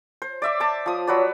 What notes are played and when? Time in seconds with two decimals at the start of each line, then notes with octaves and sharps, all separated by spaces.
0.22 C5
0.42 D5 E5 D6
0.60 A5 D6
0.86 F3 D#6
1.07 F#3 B4 D5